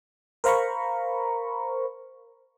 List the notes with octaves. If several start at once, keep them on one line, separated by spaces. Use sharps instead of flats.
A#4 C5 F5 A#5 B5 C#6